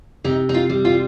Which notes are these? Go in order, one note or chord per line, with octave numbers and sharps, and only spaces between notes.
C3 D#4
D#4
F4
G3
F4